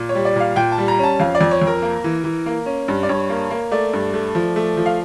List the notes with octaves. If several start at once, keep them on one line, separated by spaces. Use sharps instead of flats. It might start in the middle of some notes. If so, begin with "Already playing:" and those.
Already playing: A#2
C#5
G3
D5
A#2 F5
A#2 G5
A5
G3
A#5
C#4 A5
F2 F5
D5
F2
C#5
F2
A#4
A#3
E3
E3
A#3
C#4
G2
D5
G2 C#5
A#3
A#3
A3 D5
G2
A3
F3
A3
F3
F5